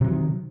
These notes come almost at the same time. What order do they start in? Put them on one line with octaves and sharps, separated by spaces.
C3 F#3 E3 D#3